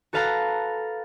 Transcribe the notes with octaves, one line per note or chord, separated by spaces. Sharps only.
F#4 A4 B4 F5 A5 A#5